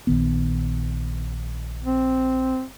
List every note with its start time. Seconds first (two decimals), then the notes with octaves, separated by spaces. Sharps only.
0.07 A#1 D#3 B3
1.85 C4